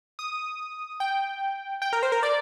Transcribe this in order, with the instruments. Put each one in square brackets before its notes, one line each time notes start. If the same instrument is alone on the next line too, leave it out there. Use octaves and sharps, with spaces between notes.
[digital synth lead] D#6
G5
G5
A#4
C5
A#4
D5